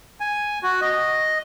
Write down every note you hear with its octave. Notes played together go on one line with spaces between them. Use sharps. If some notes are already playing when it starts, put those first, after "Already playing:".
G#5
F#4
D#5